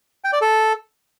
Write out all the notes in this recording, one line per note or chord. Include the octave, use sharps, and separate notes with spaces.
G5
D5
A4